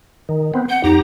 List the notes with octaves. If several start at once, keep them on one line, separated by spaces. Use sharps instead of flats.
D#3
B3 C4
F#5 G6
F2 D#4 G4 A#5